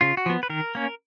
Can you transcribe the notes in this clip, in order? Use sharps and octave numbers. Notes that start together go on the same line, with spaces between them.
C#3 F4
F#4
F3 B3
B4
D#3 A#4
A#3 C#4